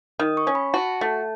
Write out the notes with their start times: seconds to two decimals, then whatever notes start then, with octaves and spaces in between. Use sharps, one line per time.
0.19 D#3 D#6
0.37 C#6
0.47 C#4
0.55 B5
0.74 F#4 A5
1.01 A3